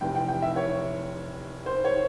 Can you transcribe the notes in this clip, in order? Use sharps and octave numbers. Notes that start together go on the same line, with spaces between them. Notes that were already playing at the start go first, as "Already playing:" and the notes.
F1 F2 C3 E3 G5
G5
G5
E5
C#5
C5
C#5